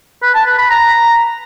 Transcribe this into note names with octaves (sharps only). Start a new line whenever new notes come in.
B4
A5
B4
B5
A#5